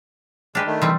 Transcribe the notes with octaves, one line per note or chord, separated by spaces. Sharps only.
G#3 D4 G4 B4 F6
D#3 A3
C3 E3 G3 C4